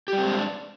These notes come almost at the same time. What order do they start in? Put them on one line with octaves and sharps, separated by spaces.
G4 G3 C4 G#3 D4